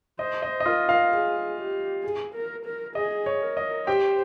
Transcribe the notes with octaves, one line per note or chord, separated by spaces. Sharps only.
C5 D#5
D#5
D#5
F4 A#4 F5
F4 F5
G#4
G4
G#4
A#4
A#4
G#4 D#5
C#5
A#4
D#5
G4 C5 G5